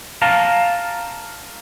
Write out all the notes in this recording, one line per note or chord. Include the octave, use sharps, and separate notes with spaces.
F5 A5 A#5